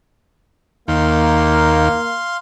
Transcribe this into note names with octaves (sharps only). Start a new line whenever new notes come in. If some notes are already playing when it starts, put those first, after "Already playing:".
D#2 A#3 F5 C6